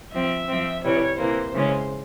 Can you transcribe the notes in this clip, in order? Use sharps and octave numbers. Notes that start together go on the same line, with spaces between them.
F3 C4 E5
F3 C4
C3 E3 G3 C#5
C3 E3 A#3 C5
C#3 E3 G#3 C#4